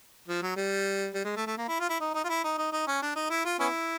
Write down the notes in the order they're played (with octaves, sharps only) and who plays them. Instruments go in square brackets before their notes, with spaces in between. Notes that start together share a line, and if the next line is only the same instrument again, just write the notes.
[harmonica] F3
F#3
G3
G3
G#3
A3
A3
A#3
E4
F4
E4
D#4
D#4
F4
E4
D#4
D#4
D#4
C#4
D4
D#4
E4
F4
B3 C#4 E4